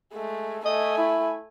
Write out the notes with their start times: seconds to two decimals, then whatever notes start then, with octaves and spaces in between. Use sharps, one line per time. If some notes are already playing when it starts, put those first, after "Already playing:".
0.14 G#3 A3
0.65 A3 D#5 G#5
0.98 E4